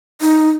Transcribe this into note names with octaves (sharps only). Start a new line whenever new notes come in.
D#4